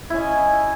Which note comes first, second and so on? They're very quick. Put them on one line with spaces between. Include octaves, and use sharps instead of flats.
E4 C#4 D#5